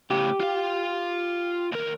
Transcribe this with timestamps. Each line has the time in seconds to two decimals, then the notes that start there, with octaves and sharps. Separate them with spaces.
0.11 A2 C#3 G4
0.40 F4 F5
1.72 D#2 A#4